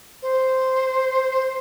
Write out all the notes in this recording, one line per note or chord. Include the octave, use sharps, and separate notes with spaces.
C5
C5